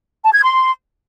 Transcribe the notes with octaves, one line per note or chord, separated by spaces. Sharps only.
A5
G#6
C6